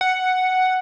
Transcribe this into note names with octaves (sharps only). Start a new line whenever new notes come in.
F#5